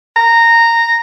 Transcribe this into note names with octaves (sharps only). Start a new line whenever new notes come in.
A#5